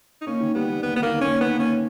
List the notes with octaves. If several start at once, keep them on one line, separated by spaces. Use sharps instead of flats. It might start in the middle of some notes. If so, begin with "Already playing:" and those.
D#4
A#3 C#4
D#3
G3 B3
G3
D#2 B3
D#3 B3
A#3
D#3
D#2 C#4
D#3 B3
A#3 C#4